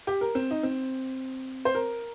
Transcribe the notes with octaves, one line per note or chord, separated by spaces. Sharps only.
G4
A#4
C4
D#4
C4
C5
A#4